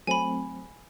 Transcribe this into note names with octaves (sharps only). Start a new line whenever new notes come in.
F#3 A3 C4 G#5 B5